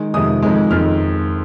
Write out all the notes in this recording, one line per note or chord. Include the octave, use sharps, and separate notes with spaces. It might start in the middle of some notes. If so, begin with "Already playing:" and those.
Already playing: D#3 G#3
F2 C3 D#3 G#3 D#6
F2 D#3 G#3
F2 D#3 G#3 F6